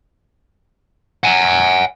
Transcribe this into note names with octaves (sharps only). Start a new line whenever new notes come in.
F#5 G#5